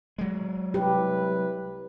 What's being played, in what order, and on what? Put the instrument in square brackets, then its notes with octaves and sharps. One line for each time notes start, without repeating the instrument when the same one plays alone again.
[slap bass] F#3 G#3
[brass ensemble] C2 E4 B4 [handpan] G4